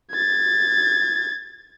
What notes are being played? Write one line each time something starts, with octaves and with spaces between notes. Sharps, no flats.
G#6 A6